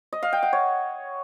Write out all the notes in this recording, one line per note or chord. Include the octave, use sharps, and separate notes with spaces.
D#5
F5
G5
F#5
C#5